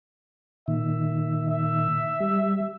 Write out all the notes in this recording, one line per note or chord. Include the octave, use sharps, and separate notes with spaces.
A#2 D#3 E5
E5
G3